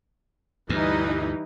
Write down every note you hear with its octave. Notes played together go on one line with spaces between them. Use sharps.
D2 G2 E3 G3 D#4